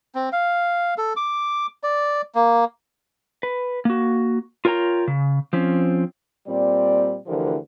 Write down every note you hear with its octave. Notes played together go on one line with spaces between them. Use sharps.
C4
F5
A4
D6
D5
A#3
B4
A#3 F#4
F4 A#4 C#5 G5 A#5
C#3
F3 C4 C#4
A#2 G3 C4 D5
D2 D3 E3 F3 G4 A#4